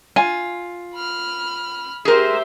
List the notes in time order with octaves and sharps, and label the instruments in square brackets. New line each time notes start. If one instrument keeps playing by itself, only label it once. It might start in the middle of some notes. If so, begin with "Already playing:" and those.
[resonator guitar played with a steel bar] F4 [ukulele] G#5
[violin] B5 F6
[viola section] G4 C5 E5 [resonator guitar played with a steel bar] G#4 A#4